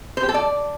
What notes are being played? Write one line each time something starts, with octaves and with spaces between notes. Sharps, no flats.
C5
G4
A4
D5